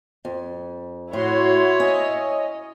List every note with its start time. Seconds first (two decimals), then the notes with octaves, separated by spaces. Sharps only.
0.25 F2
1.13 A2 E4 F#4 C#5 C6
1.80 C#4 D#5